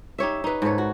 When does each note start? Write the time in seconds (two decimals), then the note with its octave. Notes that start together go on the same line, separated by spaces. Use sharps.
0.18 D#4 G4 C#5 E5
0.44 D#4 B4
0.62 G#2 A4 B4 C#5
0.78 F#4